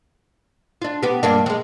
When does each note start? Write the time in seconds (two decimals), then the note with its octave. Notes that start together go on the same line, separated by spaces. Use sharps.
0.82 D4 F4
1.03 B3 G4
1.23 G2 A#3 D4
1.46 F#3 G#3